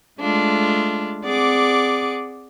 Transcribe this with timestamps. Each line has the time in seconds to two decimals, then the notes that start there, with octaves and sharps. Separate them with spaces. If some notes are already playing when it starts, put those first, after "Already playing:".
0.19 G#3 A3 D4 F4
1.23 C4 G#4 D5 F#5 D6